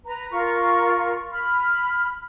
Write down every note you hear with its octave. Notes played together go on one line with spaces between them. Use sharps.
B4 A#5
F4 A#4 C#6
B5 F6